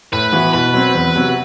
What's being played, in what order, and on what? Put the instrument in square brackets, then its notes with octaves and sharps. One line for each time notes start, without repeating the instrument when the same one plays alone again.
[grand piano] A2 [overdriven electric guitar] B4
[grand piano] E3 B3 F#4
[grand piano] B2 [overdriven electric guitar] B4
[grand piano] F#3 C4
E2
C3 F#3